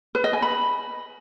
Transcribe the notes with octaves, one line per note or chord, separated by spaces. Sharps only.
B4
D#5
G#5
B5